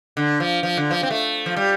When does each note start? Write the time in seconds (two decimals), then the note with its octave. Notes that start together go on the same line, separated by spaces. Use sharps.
0.17 D3
0.40 F3
0.63 F3
0.77 D3
0.91 F3
1.03 C4
1.10 A3
1.46 F3
1.56 G3